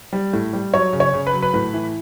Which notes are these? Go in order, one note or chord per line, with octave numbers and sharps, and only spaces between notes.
G3
A2
G3
F#3 C#5
C#3
C#5
C#3
B4
F#3
B4
A2 B4
E3